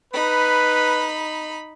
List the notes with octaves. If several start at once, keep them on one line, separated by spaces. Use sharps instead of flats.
D#4 B4 B5